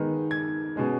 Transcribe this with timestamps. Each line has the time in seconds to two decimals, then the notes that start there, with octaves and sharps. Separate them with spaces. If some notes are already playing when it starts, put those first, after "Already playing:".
Already playing: D#3 G#3 B3 D#4
0.31 G#6
0.76 B2 G#3 C#4